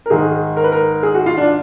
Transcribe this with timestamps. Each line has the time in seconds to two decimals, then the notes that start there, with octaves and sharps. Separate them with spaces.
0.06 A#4
0.10 G#2 D#3 G#3 G#4
0.57 A#4
0.64 B4
0.72 A#4
1.03 G#4
1.15 F#4
1.26 F4
1.37 D4